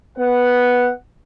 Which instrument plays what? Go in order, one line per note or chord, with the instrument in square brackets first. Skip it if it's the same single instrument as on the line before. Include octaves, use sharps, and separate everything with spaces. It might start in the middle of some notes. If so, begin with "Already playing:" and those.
[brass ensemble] B3 F#5